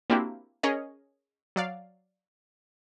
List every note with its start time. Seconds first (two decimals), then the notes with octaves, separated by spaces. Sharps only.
0.10 A#3 C4 D4 E4 F#4 G4
0.63 C#4 G#4 A#4 C#5 D#5
1.56 F#3 D5 F5